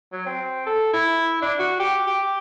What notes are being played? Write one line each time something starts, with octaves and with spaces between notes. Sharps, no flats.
F#3
C4
A4
E4
D4
F#4
G4
G4